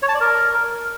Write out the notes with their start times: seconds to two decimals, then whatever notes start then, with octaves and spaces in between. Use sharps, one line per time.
0.03 C#5
0.09 A5
0.15 D5
0.21 A#4